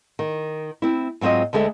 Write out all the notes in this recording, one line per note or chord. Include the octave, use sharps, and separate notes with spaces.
D#3
C4 E4
G#2 F#3 C4 F4 D#5
D2 D3 G#3 A4 E5